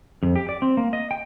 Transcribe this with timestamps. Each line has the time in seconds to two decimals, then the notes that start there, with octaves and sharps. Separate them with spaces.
0.23 F2
0.36 G4
0.49 D5
0.62 C4
0.77 A#3
0.93 D#5
1.11 G5